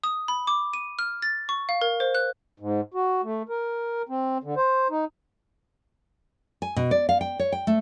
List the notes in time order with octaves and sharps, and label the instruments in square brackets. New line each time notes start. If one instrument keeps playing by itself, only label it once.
[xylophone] D#6
B5
D6
D#7
F6
A6
C#6
F5
A#4
C5
F#6
[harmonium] G#2
F#4
A3
A#4
C4
D3
C5
D#4
[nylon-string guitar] G#5
B2
D5
F5
G5
C#5
G5
A3